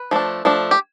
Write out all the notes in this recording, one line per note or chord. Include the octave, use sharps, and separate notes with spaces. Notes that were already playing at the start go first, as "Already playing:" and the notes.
Already playing: B4
F3 A3 D4
F3 A3 D4
G4